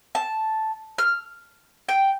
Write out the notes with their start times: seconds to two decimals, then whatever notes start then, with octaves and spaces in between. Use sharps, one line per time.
0.15 A5
0.98 F6
1.89 G5